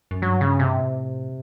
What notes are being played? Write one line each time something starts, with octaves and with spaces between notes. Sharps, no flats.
F#2
G2 F#3
C#3
C3
A2